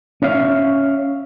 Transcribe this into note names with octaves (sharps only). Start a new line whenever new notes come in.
C#4 C#5 E5 F5